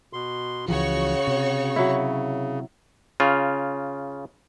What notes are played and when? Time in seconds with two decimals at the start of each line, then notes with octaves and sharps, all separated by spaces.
0.13 B2 C6
0.68 C#2 C#3 E3 F3 F#4 C#5 C#6
1.27 C3
1.76 F#3 E4
3.20 C#3 F4